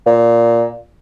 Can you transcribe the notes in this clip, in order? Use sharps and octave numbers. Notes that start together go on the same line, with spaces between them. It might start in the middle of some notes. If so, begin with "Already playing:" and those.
A#2